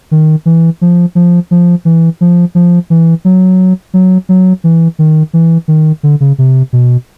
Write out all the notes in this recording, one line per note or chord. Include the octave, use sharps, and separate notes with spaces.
D#3
E3
F3
F3
F3
E3
F3
F3
E3
F#3
F#3
F#3
E3
D#3
E3
D#3
D3
C#3
C3
B2